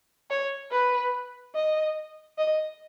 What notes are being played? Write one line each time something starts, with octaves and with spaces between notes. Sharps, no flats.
C#5
B4
D#5
D#5